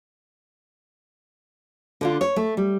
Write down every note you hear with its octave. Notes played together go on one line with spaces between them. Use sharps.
D3 D4 F4
C#5
A3
G3